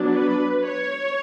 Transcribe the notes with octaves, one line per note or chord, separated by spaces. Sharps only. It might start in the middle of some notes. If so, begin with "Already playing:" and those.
Already playing: F#3 B3 D4
B4
C#5